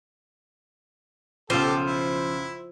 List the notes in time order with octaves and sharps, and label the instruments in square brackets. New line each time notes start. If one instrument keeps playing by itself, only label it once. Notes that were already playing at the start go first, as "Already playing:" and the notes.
[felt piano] B1 C#3 D#7 [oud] F3 [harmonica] G4 A4 [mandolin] C5
[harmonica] E4